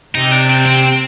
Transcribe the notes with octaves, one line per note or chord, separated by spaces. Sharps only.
C3 D#4
D4
C4
C4